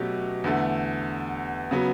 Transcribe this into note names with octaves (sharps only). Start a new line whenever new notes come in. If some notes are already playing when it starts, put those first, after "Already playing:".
Already playing: B2 F#3 A3 C#4 G4
E2 D3 A3
C#3 F#3 B3